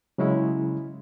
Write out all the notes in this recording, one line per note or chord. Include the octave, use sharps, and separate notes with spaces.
C#3 F#3 G#3 C#4 E4